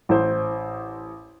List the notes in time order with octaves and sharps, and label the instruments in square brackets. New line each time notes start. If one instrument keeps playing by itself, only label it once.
[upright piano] A1 C5